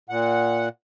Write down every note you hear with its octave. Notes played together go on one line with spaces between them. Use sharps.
A#2 F#5